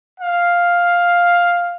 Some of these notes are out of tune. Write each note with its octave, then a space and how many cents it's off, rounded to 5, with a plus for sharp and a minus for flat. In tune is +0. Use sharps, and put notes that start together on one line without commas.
F5 +5